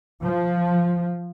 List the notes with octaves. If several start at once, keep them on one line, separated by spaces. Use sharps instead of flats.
F3